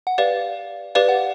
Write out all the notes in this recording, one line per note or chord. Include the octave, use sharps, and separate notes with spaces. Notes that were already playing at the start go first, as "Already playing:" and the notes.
F#5
G4 B4 D5 F5
G4 B4 D5 F5
F#5